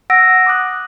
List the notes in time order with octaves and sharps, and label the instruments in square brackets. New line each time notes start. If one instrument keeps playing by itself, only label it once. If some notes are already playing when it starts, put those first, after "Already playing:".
[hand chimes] F#5 E6 A#6 D7
D6 D#6 F#6